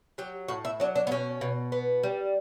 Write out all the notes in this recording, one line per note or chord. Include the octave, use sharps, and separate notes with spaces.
F#3 G4
A2 F#4
E4
F#3 D4
D4
B3
B2 C#4
B2
B3
G3